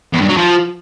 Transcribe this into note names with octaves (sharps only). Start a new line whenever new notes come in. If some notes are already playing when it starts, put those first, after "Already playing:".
E2
G2
F#3
F3